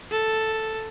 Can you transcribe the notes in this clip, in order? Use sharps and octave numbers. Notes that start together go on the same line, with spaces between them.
A4